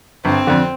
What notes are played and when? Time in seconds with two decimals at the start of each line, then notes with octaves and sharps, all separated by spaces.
0.25 G1 C4
0.47 F2 D3